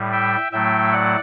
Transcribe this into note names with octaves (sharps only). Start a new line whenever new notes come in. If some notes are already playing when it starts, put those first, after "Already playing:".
Already playing: A2 G3
E5 G5
A2 F#3 A3 E5 G5
D5 F#5